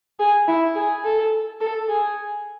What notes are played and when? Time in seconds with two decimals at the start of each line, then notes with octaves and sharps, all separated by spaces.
0.19 G#4
0.48 E4
0.75 G#4
1.04 A4
1.61 A4
1.89 G#4